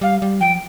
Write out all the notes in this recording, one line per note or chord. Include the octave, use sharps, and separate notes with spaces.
G3 F5
G3
F3 G5